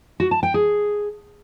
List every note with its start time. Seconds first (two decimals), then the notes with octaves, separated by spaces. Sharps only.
0.20 F#4
0.31 A5
0.43 G5
0.54 G#4